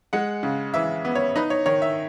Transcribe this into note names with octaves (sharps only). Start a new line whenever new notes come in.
G#3 F#5
C#3
E3 E5
B3
C#5
D#4 B4
C#5
D#3 C#5
E5